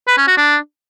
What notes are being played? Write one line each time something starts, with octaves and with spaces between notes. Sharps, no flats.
B4
C#4
F#4
D4